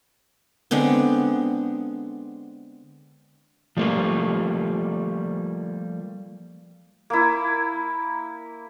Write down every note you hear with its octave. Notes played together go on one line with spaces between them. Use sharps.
D3 G#3 B3 C4
F3 G3 A3 A#3 F4
A#3 E4